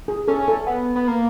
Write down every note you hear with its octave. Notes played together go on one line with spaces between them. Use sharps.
G#4
C#4 A4
A4
B3
B3
A#3